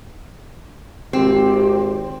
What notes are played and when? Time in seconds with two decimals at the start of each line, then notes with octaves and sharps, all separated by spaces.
1.13 G#1 C4 G4